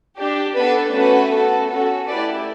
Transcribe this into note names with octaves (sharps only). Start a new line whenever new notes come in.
D4 G4
B3 D4 A4 B4
A3 C#4 F#4 B4
B3 F#4 A4
C#4 F#4 A4
A3 E4 G4 B4 D5